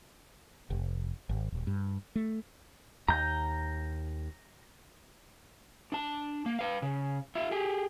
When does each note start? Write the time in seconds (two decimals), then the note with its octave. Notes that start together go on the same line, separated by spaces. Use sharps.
0.70 F1
1.29 G#1
1.52 D#1
1.67 G2
2.15 A3
3.09 D#2 A#5 G6
5.92 D4 A5
6.46 A#3
6.59 B4 F5
6.82 C#3
7.35 F4 E5
7.51 G4 G#4